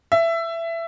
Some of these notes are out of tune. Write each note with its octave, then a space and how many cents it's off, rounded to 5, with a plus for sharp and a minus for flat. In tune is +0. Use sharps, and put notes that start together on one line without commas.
E5 +15